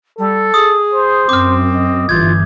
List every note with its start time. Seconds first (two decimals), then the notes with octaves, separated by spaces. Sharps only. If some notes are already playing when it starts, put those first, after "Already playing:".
0.18 G3 A4
0.54 G#4 D#6
0.93 C5
1.29 F#2 C4 D6 F6
1.75 D#5
2.09 G1 E3 F4 G6 G#6